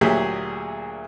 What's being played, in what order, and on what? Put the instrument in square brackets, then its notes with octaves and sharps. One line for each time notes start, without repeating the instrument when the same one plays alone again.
[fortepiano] D2 A#2 F#3 G4 G#4 E5